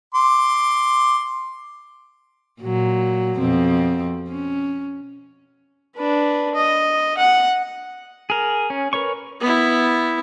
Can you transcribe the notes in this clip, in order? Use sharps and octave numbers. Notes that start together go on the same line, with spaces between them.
C6 D6
A#2 F#3
F2 B2 C4
C#4
D4 B4
D#5
F#5
G#4 A#4
C#4
A#4 B4 C#5 C#6
B3 E4